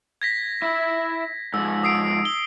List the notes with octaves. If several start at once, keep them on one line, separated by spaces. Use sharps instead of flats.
G#6 A#6 B6
E4 E5
G#2 F3 E6
D#6 C7 D7
G7